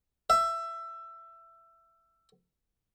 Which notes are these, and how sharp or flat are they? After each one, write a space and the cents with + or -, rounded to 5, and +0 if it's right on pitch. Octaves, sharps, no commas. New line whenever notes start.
E5 +20